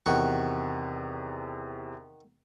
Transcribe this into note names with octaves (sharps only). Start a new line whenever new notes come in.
E2 C3 D#3 F#4 C#6